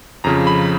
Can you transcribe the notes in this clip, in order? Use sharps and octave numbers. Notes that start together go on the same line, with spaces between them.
F2 C#3 F3 A#5
B5